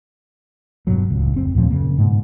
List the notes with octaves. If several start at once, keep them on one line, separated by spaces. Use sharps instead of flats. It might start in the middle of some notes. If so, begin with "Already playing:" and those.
E1 G2 B2 F#3
D1 C#2
F1 C4
D#2 A#2 F3 A3
F#2 C#3 A#3
G#2 B2